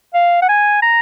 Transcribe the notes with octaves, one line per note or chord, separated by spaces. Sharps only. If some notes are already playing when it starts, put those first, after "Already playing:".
F5
F#5
G#5
A#5